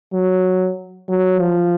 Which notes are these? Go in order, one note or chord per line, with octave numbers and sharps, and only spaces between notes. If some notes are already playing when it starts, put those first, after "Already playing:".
F#3
F#3
F3